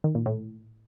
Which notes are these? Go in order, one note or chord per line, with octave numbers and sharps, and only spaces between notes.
D#3
A#2
A2